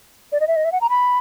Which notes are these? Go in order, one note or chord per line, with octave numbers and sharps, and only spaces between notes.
D5
D#5
E5
D#5
E5
F#5
A#5
B5